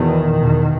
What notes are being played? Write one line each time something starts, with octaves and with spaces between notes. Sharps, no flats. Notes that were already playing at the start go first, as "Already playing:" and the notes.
Already playing: E2 B2 D#3
E2 B2